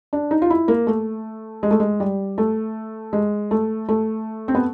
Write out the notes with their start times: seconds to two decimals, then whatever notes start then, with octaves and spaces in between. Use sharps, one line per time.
0.13 D4
0.31 D#4
0.42 F4
0.50 E4
0.68 A#3
0.87 A3
1.63 G#3
1.71 A3
1.80 G#3
2.00 G3
2.38 A3
3.13 G#3
3.51 A3
3.89 A3
4.48 C4
4.55 B3